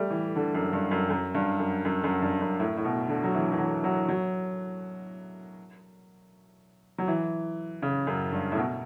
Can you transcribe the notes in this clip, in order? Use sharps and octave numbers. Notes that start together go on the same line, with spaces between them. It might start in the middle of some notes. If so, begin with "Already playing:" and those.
Already playing: G3 A3
E3
D3
F#2
G2
F#2
F#2
G2
F#2
F#2
F#2
G2
F#2
A2
A2
B2
D3
F#3
E3
E3
F#3
F#3
F#3
F#3
E3
C#3
F#2
G2
A2
B2